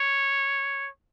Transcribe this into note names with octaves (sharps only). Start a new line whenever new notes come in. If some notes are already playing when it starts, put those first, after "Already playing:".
Already playing: C#5